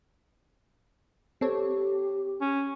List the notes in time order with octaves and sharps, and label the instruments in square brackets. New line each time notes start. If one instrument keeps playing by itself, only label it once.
[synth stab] C4 A4 C#5 [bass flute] G4
[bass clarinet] C#4